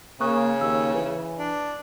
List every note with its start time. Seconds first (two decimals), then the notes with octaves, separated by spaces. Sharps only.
0.21 C#3 A#3 C#6 D#6 F#6
0.61 D#2 E6
0.95 E3 B4
1.39 D4